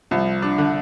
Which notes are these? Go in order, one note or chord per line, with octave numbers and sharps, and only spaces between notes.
C2 F3
D4
D3